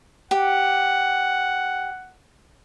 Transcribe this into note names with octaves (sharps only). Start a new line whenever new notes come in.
G4 F#5